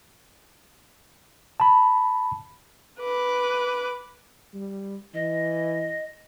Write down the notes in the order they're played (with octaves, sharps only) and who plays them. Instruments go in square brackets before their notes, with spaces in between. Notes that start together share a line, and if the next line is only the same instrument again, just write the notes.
[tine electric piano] A5 B5
[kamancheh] B4 D6
[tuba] G3
[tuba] E3 [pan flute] D#5